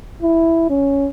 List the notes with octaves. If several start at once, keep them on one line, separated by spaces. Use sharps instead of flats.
E4
C#4